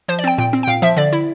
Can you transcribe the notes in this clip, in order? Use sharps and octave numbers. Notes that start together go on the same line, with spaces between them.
F3 C5
D5
C4 G5
A#2 G5
C4
G5
A#2 F5
F3 E5
D3 D5
E4